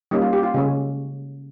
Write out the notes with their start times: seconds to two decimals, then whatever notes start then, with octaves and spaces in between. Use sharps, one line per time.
0.11 G3 A#3 C#4 D#4
0.22 F4
0.33 G4
0.43 F4
0.54 C#3 G#3 C#4